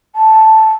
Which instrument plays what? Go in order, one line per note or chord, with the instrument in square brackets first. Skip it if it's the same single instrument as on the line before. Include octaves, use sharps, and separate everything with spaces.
[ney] A5